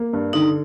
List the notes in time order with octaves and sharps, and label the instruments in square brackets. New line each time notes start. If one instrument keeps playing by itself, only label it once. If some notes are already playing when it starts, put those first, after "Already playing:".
Already playing: [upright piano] A#3
G2
[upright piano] D3 [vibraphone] D#4